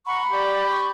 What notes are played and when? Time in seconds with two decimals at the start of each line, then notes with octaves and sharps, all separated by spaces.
0.06 F#5 A#5 B5 C#6
0.31 G4 D5
0.70 C#6